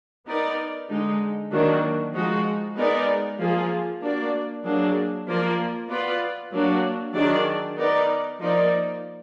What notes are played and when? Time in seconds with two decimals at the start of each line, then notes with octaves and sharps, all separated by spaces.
0.26 B3 D#4 A#4 D5
0.88 D3 G#3 D#4
1.51 D#3 F#3 A#3 D4 F#4
2.13 F3 G#3 D#4 F#4
2.76 G#3 B3 D#4 A#4 D5
3.39 F3 A#3 F4 G#4
4.01 A#3 D4 F#4 D5
4.64 F#3 A#3 D4 G#4
5.27 F3 A#3 F4 A#4 D5
5.89 B3 F4 B4 D5
6.51 F#3 A#3 D4 F#4
7.14 D#3 F#3 D4 G#4 D5
7.77 B3 D#4 A#4 D5
8.40 F3 A#3 D#4 A#4 D5